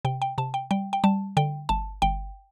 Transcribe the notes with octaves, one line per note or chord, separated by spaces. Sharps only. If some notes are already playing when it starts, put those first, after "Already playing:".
C3 G5
G5
C3 A5
G5
G3 G5
G5
G3 A5
D3 G5
G1 A5
G1 G5